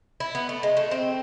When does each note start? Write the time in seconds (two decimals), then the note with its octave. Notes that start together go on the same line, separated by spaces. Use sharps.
0.20 E4
0.35 B3
0.49 A3
0.63 G#3
0.77 A3
0.91 C4